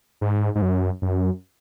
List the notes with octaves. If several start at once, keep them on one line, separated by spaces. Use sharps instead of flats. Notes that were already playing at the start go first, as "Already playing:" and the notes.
G#2
G#2
F#2
F#2